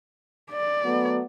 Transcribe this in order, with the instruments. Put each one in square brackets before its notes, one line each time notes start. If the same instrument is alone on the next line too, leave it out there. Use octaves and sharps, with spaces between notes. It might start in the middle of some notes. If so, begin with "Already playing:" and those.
[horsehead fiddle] D5
[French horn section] F#3 A3 B3